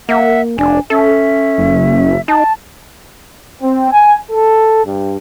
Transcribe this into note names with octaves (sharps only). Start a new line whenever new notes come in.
A#3 E5 F#5
F1 D4 G#5
C#4 A4 E5
F#1
D#4 A5
C4
G#5
A4
G2